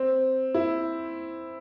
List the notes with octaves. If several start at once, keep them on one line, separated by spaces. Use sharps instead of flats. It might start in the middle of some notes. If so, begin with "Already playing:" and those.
Already playing: C4
E4